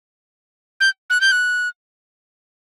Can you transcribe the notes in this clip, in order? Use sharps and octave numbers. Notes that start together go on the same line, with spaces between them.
G6
F#6
G6
F#6